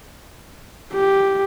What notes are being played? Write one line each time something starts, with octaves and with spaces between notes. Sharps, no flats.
G4